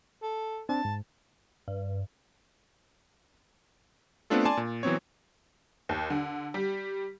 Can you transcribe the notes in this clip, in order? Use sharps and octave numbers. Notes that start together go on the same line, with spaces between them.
A4
C4 D4 A5
G#2
G2
A3 B3 C4 D4 F4 A4
D5 G#5 A5 C6
A#2
E3 F#3 B3 C4 C#5
D#2
D3
G3